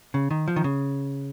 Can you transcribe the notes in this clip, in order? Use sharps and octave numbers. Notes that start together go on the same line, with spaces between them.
C#3
D#3
F3
D#3
C#3